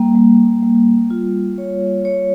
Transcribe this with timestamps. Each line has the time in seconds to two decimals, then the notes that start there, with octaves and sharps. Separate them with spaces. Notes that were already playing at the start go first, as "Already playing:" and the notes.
Already playing: G3 A#3
0.15 G3
0.63 G3
1.10 F4
1.58 C#5
2.05 C#5